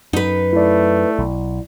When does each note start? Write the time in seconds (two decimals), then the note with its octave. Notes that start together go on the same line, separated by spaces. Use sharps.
0.13 F#2 D#4 B4
0.53 A3 E4 D5
1.19 B1